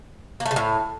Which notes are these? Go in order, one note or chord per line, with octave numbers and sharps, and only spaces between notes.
A#3
A3
C#3
A2